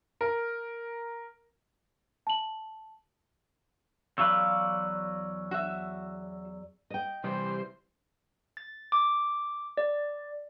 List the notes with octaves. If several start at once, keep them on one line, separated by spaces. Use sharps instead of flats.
A#4
A5 F#7
E2 F#3 B4 D5 F5 C#6 E6
F#4 E5
D#5 G5
C3 E3 G3 C5
A6
D6
D5